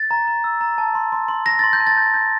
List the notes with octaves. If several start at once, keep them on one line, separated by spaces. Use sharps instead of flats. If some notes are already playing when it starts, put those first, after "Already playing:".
Already playing: A6
A#5
A#5
E6
A#5
A5
C6
C6
C6
C6 A#6
C6 A6
G6
A5
A6
G6
G6